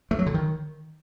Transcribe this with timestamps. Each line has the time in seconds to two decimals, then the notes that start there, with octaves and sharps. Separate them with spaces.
0.11 A3
0.19 F#3
0.26 D3
0.34 D#3